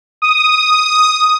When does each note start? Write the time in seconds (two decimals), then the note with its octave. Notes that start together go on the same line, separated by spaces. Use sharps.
0.22 D#6